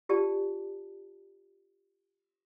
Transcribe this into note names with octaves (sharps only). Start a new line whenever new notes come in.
F4 G4 D5 A5